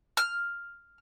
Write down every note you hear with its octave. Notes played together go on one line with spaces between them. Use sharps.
F6